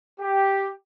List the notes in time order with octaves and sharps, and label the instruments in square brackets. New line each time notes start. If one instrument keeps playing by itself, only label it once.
[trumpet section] G4